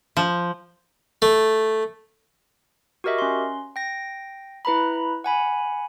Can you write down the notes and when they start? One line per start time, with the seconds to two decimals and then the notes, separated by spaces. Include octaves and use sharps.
0.17 F3
1.22 A3
3.04 F#4 G4 A#4 D#5 E5
3.18 C#4 C6
3.76 G5 A#6
4.65 E4 B4 A#5 B5
5.24 F#5 G#5 B5